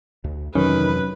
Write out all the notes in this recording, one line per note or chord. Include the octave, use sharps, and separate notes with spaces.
D2
F2 C3 D#3 E3 F#3 C#4 B4